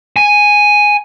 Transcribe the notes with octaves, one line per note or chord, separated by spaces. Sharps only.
G#5